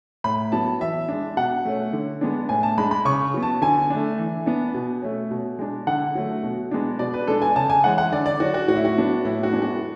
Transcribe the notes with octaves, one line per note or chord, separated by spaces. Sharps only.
A2 B5
F#3 B3 A5
E3 E5
G#3 D4
B2 F#5
A3 C#4
D3
G#3 B3 D4
A2 G#5
A5
G#3 D4 B5
B5
C#3 C#6
F#3 B3
A5
D3 G#5
A3 D4
E3
B3 D4
B2
A3 C#4
B2
G#3 D4
D3 F#5
F#3 A3
B2
G#3 B3 D4
B2 D5
B4
G#3 D4 A4
G#5
C#3 A5
G#5
E3 G#3 C#4 F#5
F#5
D3 D5
D5
F#3 C#4 F#4
F#4
A2 F#4
E4
F#4
F#3 B3 D4
A2 E4
F#4
G#3 B3 D4
F#4